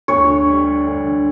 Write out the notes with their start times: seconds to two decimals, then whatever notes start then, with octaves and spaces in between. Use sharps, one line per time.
0.08 D2 C#5
0.28 D3
0.47 G3
0.67 D4
0.87 D2
1.05 D3